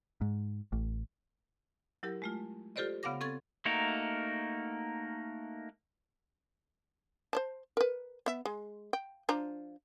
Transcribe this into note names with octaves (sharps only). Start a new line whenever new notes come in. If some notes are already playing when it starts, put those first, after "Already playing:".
G#2
A1
F#3 E4 G4 A#4
G#3 A3 F4
F4 G4 A4 C5 D5 D#5
C#3 B3 F5 F#5 D6 A#6
C4 A4 C#6 G#6 A6
A3 A#3 D#4 F#4 A#4
C5 D5 A5
A#4 B4
B3 E5
G#3
G5
F3 D4 A#5